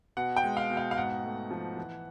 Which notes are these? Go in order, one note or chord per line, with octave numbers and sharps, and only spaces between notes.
B2 F#5
G5
G#3
F5
B2
F5
F5
G#2 F#5
A3
F3
E3